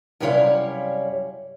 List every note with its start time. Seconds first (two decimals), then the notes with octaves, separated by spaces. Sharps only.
0.20 F#2 C3 G3 E4 C#5 F5